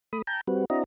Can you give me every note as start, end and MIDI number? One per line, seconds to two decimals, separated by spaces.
0.13 0.22 57
0.13 0.22 83
0.13 0.22 87
0.27 0.41 79
0.27 0.41 81
0.27 0.41 82
0.27 0.41 91
0.47 0.65 55
0.47 0.65 60
0.47 0.65 66
0.47 0.65 71
0.70 0.84 60
0.70 0.84 62
0.70 0.84 64
0.70 0.84 66
0.70 0.84 75
0.70 0.84 82